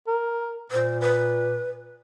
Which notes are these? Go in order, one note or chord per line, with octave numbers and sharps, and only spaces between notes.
A#4
A#2 C5
B4